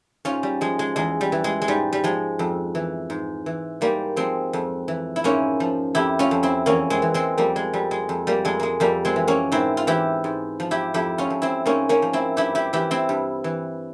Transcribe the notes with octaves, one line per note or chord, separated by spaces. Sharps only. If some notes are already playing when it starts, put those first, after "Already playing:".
G#2 C#4 F4
G3
F3 G#3
G#3
E2 G#3
G3
E3
G#3
G#3
G#2 G3
G3
F3 G#3
F2
E3
G#2
E3
G#2 G3 A#3
F3 G#3 C4
F2
E3
E4
G#2 A#3 C#4
F3
F2 E4 G4
C#4 F4
F2
C4 E4
E2 A#3 C#4
G#3 C4
E3
G#3 C4
F2 G3 A#3
G#3
F2 G3
G#3
F2
G3 A#3
F2 G#3
G#3 A#3
F2 G3 A#3
G#3 C4
E3
A#3 C#4
G#2 C4 E4
F4
E3 E4 G4
G#2
F3
E4 G4
F2 E4 G4
C#4 F4
F2
C4 E4
G#2 A#3 C#4
A#3 C#4
F3
C4 E4
G2 E4 G4
E4 G4
E3 E4 G4
C4 E4
G2
E3